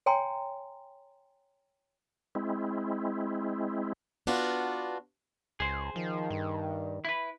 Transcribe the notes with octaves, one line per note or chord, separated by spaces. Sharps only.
C#5 G5 G#5 A#5 C6
G#3 C4 E4
B3 D4 F4 F#4
C#2 G#4 C5
D#3 F3
G2
E4 B4